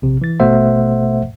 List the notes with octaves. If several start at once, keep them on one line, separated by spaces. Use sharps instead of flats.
A#1 C3
E3 A6
G#1 B2 A3 C5 E5 F#5